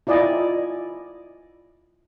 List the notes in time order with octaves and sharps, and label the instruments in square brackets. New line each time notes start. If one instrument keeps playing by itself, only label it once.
[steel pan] E4 F4 D5 D#5 G#5